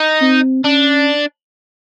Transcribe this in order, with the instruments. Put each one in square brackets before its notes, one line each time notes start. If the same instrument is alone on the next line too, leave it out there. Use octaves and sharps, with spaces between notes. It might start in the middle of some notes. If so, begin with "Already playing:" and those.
Already playing: [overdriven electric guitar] D#4
[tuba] C4
[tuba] C#4 [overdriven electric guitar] D4